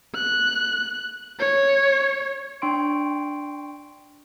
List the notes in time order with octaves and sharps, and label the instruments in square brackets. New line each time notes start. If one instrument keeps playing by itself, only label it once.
[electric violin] F#6
C#5
[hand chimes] D4 G5 C6 C#6 D7